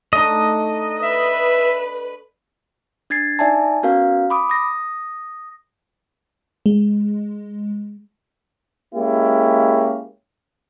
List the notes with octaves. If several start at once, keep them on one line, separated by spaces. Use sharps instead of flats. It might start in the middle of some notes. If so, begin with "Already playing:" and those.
A3 D4 D#4 D#5
B4 E5
D4 G#6 A6 C7
D#4 D5 E5 G#5 A5
B3 C#4 F#4 A#4 F5
B5 D6 D#6
D#6 A#6
G#3
G#3 A#3 C#4 E4 G4